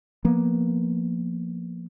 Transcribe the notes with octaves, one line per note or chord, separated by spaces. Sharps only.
F3 A#3 B3